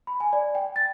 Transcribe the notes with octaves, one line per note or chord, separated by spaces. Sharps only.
B5
G#5
D5
G5
A6